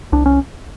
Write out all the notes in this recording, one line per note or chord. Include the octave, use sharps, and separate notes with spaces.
C2 D4
C#4